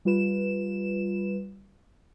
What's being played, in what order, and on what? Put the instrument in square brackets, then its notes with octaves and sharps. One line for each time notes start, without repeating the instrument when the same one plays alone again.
[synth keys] G3 F4 B4 E7